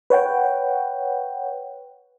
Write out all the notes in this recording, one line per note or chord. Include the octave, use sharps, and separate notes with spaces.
B4 C#5 F#5 G5